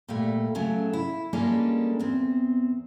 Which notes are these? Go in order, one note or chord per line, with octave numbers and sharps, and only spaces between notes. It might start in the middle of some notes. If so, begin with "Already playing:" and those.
A#2 G3 A3
C#3 F#3 A3 C#4
E4
G3 G#3 A#3 C#4 D4 A4
E2 C4